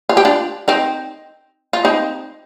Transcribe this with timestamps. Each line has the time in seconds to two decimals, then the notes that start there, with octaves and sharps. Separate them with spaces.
0.09 F4
0.17 G4
0.25 D4 F4
0.68 C4 D#4
1.73 F4
1.85 C4 D#4